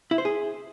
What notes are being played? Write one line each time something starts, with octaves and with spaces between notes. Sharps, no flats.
E4
C5
G#4